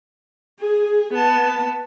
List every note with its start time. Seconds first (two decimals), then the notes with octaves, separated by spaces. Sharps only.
0.59 G#4
1.13 B3 A5